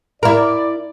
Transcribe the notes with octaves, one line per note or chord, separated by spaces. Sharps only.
E4 A#4 D5